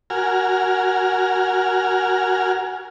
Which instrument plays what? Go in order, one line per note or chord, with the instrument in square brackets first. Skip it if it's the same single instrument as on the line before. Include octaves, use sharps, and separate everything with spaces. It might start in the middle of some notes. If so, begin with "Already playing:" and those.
[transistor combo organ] F#4 A#4 G#5 F6